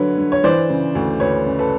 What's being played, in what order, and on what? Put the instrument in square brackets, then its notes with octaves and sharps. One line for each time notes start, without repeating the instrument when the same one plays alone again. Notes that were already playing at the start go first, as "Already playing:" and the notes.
Already playing: [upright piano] D3 F#3 B4 C#5
D3
C#5
E3 C5 D5
C#3
D2
D2 B4 C#5
C#3
A4 B4